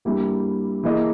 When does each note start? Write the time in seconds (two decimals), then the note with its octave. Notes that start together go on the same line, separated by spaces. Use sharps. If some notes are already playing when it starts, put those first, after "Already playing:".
0.05 G2 G3 A#3 E4 G4
0.83 E3 A#3 E4 G#4 D#5